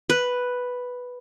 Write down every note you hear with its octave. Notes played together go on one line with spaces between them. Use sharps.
B4